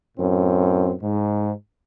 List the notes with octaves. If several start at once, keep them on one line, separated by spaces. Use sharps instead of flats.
F#2 A2 C4
G#2